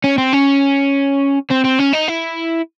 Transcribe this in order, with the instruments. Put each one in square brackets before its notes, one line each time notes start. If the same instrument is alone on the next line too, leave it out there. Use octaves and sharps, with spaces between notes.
[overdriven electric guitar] C#4
C4
C#4
C4
C4
C#4
D#4
E4